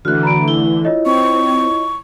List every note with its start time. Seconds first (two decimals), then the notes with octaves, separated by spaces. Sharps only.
0.05 D3 E3 A3 F#4 F6 F#6
0.23 A#5 B5 D7
0.48 E4 G7
0.85 F4 C#5 D#5
1.06 C4 C#6